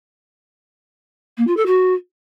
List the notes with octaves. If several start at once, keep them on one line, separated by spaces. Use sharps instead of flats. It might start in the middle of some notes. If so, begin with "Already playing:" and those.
A#3
F4
A4
F#4